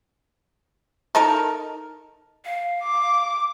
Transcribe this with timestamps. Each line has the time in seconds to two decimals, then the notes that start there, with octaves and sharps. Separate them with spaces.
1.15 D#4 A4 A#4
2.45 F5
2.84 D6